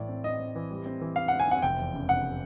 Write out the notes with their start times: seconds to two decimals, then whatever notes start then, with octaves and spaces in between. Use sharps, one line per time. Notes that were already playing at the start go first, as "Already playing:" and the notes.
Already playing: A2 E3 D5
0.09 C4
0.24 C4 D#5
0.40 C4
0.56 E3
0.71 G3
0.86 C4
1.01 E3
1.16 C4 F5
1.28 F#5
1.32 C4
1.40 G#5
1.48 C4 F#5
1.62 F1 G5
1.78 E2
1.94 C#3
2.08 F1 F#5